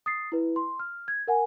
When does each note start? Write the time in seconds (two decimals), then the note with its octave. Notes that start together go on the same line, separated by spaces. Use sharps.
0.06 D#6 A6 C7
0.32 E4 B4
0.56 C6
0.79 F6
1.08 G#6
1.27 A#4 F#5 G#5